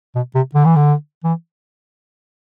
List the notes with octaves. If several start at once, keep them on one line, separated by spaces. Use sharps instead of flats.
B2
C3
D3
E3
D3
E3